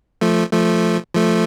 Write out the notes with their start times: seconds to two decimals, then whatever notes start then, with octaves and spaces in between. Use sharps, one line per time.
0.21 F3 A3
0.52 F3 A3
1.15 F3 A3